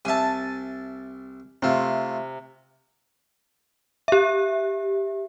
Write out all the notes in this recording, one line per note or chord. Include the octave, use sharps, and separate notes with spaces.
C2 E5 G#5 A5
C3 A3 F4
G4 E5